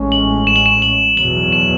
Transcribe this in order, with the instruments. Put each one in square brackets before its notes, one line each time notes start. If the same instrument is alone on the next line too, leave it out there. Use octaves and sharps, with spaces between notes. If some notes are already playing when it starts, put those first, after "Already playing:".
Already playing: [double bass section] A1 A2 G#3 C#4
[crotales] F#7
E7
F#7
E7
F#7
[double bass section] E2 B2 F#3 [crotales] F#7
[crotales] E7